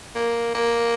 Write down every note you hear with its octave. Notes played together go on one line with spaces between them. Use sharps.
A#3
A#3